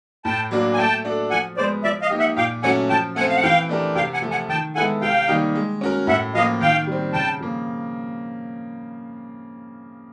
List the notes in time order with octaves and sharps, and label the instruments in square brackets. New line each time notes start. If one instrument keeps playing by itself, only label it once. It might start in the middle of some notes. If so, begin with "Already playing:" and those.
[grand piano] A2 [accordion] G5 A5
[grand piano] F#3 A#3 D4 F#4
[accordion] G#5
[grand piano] A3 [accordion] G5 A5
[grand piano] D4 F#4 A4
[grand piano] F3 [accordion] F#5 G#5
[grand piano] G#3 B3 [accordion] C5 D5
[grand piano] F3 [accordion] D5 E5
[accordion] D#5 F5
[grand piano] A#3 D#4 G4
[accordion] E5 F#5
[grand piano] A#2 [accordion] F5 G5
[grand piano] F#3 A3 C#4 F#4 [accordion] F#5 G#5
[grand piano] F3 [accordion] G5 A5
[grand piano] A3 [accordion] F#5 G#5
[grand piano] C4
[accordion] F5
F#5
[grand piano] E3 [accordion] F5 G5
[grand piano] A3 D4 G4 A#4
[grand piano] C3 [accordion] F5 G5
[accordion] F#5 G#5
[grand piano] F3 A3
[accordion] F#5 G#5
[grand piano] D#3 [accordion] G5 A5
[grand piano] G#3 B3 E4 A4 [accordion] F#5 G#5
[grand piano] C3 [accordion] F5 G5
[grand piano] D#3 G3 A#3 D#4
G#3
C#4 F#4 A#4
[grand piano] A2 [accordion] E5 F#5
[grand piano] F3 A#3 [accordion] D#5 F5
[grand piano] D#3 [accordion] F5 G5
[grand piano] G3 C4
[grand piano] C#3 [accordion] G5 A5
[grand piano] F3 A#3